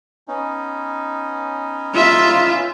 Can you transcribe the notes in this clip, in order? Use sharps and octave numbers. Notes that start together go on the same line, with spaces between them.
B3 C#4 D#4
F4 E5